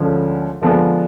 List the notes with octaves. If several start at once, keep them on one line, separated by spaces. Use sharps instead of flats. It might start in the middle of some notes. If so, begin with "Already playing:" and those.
Already playing: D2 D3 F3 G#3 C#4
D3 F3 G#3 B3 D4